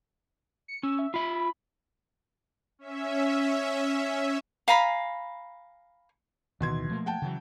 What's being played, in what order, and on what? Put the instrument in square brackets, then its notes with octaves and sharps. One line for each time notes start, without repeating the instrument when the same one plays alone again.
[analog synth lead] C#7
[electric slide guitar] C#4 [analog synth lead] E6
[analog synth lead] E5
[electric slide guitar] F4 E5 [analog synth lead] B5
[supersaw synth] C#4 E5
[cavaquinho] F5 G#5 A#5 B5
[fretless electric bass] D1 D#3 E3 [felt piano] B2 C6 G#6
[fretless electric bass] F3 A3 A#3
[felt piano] F#5 G5 A5
[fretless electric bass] C#3 E3 F#3